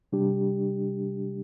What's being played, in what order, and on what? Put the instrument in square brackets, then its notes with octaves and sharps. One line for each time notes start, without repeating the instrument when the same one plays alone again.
[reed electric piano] C3 G3 D4 G4